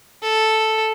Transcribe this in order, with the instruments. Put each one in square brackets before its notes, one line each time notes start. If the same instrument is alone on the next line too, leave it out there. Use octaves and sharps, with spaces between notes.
[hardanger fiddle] A4